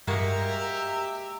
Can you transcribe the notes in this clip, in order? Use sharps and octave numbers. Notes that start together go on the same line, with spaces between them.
G2 G#3 A#3 F#4 G4 E5 A#5